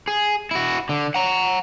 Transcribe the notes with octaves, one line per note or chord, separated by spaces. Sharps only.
G#4
E4 F#4
D3
F#5 A#5